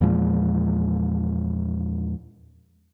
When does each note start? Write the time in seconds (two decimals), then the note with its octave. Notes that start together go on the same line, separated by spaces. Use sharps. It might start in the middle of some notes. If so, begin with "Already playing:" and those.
0.01 E2 A#2 F3 G#3